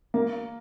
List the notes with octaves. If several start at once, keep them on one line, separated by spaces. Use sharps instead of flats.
A#3